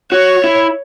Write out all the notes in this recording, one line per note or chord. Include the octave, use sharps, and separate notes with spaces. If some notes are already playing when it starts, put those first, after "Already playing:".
F#4 C#5
E4